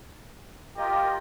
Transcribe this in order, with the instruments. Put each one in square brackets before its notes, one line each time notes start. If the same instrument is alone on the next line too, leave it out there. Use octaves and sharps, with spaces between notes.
[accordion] F4 A#4 D#5 [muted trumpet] G4